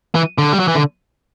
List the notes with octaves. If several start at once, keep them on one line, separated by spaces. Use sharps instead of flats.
E3
D3
G3
F#3
E3
D3